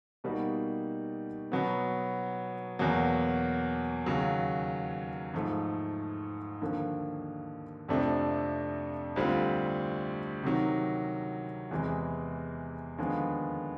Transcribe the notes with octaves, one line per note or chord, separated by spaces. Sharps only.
B2 G3 A#3 D#4 F#4
B2 F#3 B3
E2 B2 F#3 A#3
D#2 C#3 F#3
G#2 F3 A3
D#2 D3 F3 A#3
F2 C3 F3 A3 D4
D2 D3 G3 C4 F4
C3 D#3 F#3
E2 C3 E3 G#3
D#2 D3 F3 G#3 B3